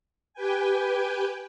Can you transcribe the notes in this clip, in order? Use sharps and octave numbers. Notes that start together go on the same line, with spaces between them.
G4 B4 G5 G#5